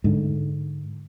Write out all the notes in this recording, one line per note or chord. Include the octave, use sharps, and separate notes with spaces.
G#2 D3